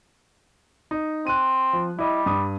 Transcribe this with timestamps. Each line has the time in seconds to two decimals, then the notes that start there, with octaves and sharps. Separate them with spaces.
0.91 D#4
1.27 C4 F#6 D#7
1.73 F3
1.99 G3 E4 D#5
2.26 G2 D#6